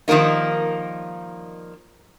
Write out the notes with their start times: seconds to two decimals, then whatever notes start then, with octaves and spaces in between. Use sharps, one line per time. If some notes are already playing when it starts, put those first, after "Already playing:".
0.08 D#3 F3 G3 A#3 D#4